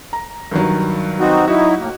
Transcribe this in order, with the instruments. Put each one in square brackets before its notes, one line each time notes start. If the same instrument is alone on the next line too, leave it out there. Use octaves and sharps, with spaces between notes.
[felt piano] A#5
G2 D#3 F#3
[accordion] C4 D#4 F#4
[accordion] F#3 D#4 E4 [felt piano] F#4
[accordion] A2 A#3